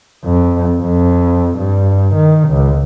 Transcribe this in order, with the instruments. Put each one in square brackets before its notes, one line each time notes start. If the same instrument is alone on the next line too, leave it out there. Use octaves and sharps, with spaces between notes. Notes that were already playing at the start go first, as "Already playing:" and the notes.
[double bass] F2
F2
G2
D#3
C#2